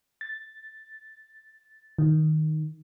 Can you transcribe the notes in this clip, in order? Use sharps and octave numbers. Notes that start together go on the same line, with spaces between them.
A6
D#3